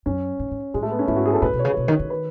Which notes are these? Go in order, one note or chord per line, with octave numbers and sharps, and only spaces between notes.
F#2 C#4
G#2
G#2
A2 G#3
A3
B3
C#4
G#2 E4
F#4
G#4
A4
A2 B4
B2
C#5
C#3
B2
D#3
D#3
B4